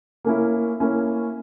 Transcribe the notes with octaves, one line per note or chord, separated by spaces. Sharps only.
A#3 C#4 E4
A#3 C#4 E4